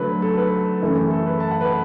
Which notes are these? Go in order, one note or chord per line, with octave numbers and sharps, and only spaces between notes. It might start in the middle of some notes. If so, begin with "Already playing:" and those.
Already playing: D3 F#3 A3 A4 B4
A4
B4
F#2 E3 A3 E4
A4
B4
A5
F#5
B4